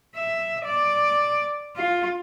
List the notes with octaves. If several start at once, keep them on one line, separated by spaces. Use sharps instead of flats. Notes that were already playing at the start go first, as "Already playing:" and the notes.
E5
D5
F4